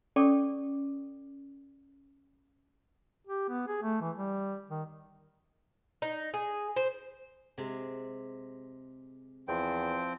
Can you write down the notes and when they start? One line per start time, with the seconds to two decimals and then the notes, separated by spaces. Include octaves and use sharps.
0.16 C#4 A4 D5 G5 C#6 D6
3.27 G4
3.49 B3
3.68 G#4
3.83 A3
4.01 E3
4.16 G3
4.70 D#3
6.02 D#4
6.34 G#4
6.76 C5
7.58 C3 G#3
9.48 E2 F3 C4 G5